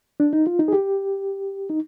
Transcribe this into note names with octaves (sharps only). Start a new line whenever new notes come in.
D4
D#4
F4
D#4
G#4
G4
D#4